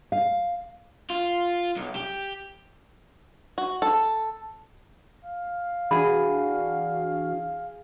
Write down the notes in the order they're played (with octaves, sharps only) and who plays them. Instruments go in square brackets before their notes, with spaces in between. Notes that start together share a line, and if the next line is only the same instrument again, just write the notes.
[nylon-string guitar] F5
[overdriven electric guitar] F4
B1
G4
[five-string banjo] F#4
A4
[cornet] F5
[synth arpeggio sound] E3 D4 F#4 [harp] G#4 [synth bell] B5